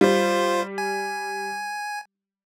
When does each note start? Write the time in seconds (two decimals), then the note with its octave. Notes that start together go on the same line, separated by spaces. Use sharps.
0.01 G3 F4 C5
0.78 G#5